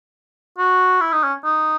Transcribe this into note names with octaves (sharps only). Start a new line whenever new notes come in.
F#4
E4
D#4
C#4
D#4